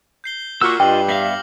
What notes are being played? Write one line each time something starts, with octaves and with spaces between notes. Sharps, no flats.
G6 C7 G7
A#2 F#4 C#6 D6 E6 F6
G2 F4 D#5 G5 D6 F#7
B3 E5 F5 A#6 C7 F#7